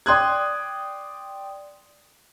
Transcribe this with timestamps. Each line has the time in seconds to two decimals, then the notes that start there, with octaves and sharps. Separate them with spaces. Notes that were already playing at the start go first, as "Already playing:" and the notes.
0.06 D5 G5 C6 D#6 F#6 G#6